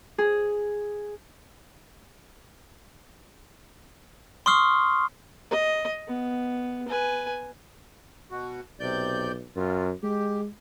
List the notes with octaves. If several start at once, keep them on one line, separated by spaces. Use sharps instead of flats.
G#4
C6 C#6 D#6 F6 C7
D#5
B3
B4 G#5
B2 F#4
B1 C3 D5 G6
F#2 F4
G#3 G4